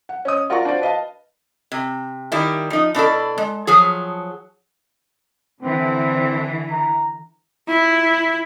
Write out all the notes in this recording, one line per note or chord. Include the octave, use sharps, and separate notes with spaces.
F#5
C#4 D#5 D#6
F4 F#4 A#4 D5 A#5 C#6
D4 F4 F#4 C5 D5
B4 D#5 F5 A5
C3
D#3 G3 E4
F3 D#4
B2 D4 E4 A4
G#3
F3 F#3 G#4
D3 E3 C4
A#5
E4